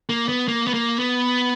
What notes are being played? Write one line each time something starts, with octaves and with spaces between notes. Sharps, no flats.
A#3
B3
A#3
B3
A#3
B3